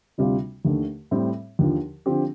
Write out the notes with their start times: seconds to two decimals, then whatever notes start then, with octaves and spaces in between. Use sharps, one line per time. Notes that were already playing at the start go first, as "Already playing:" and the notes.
0.18 D2 C3 G3 C4 F4
0.65 D#2 D3 A3
1.11 A2 G3 C4
1.59 D#2 D3 F3
2.06 D3 F3 C4 G4